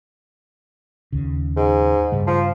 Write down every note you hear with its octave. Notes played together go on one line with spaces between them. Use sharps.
D#2 C#3
G#2
G2 C#3 G3
F3